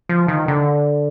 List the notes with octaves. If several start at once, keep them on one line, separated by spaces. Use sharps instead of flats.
F3
D#3
D3